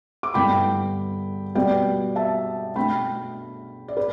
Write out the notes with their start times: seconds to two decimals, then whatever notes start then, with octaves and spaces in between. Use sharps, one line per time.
0.23 D6
0.34 G2 D3 B3 E4 G5 B5
1.55 B2 G3 B3 D5 G5
2.16 E5 A5
2.76 B2 A3 D4 G5 B5
3.88 D5
3.97 B4